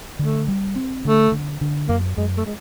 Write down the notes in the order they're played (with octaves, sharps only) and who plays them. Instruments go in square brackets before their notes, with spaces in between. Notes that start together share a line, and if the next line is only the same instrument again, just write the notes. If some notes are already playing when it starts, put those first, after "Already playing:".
[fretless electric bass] D3 [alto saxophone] A3
[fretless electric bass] G3
C4
[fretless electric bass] D3 [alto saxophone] A3
[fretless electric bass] D3
D3
[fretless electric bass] F#2 [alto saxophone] A#3
[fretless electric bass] F#2 [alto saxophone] G#3
[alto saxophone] A3
G#3